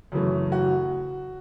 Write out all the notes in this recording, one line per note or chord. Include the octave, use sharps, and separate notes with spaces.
F#2 C#3 E3 A3
F#4